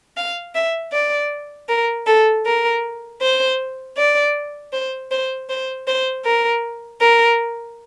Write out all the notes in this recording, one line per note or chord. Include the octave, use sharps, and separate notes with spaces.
F5
E5
D5
A#4
A4
A#4
C5
D5
C5
C5
C5
C5
A#4
A#4